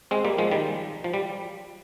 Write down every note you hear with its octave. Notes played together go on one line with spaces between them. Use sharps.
G#3 C4
G3 A#3
F3 G#3
D#3 G3
F3
G3